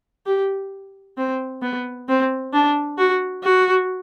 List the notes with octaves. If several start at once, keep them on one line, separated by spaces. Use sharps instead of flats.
G4
C4
B3
C4
D4
F#4
F#4